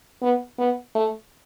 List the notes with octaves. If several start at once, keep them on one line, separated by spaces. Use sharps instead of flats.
B3
B3
A3